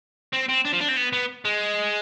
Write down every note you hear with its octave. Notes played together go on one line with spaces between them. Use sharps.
C4
C4
D4
F3
D4
C4
B3
B3
G#3